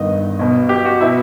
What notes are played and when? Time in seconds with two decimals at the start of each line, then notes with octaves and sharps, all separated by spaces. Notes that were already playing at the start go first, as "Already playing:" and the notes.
Already playing: G1 G2 D#3 D#5
0.39 B1 B2
0.69 G4
0.85 F#4
1.01 B2 E4